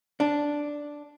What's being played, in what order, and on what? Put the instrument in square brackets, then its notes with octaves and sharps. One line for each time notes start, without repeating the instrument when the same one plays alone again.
[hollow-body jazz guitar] D4